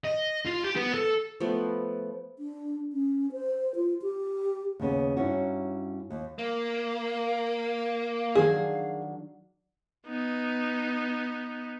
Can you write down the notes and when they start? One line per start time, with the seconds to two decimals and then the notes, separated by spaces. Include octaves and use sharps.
0.05 D#5
0.45 F4
0.63 G4
0.76 B3
0.94 A4
1.40 F3 A3 B3
2.39 D4
2.93 C#4
3.32 C5
3.75 F4
4.02 G4
4.80 D#2 C#3 B3
5.17 G2 C#4 D#4 E4 F#4
6.10 D#2
6.39 A#3 F5
8.35 D#3 F#3 D4 G#4
10.06 B3 D#4